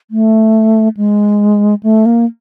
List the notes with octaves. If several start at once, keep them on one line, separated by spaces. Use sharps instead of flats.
A3
G#3
A3
A#3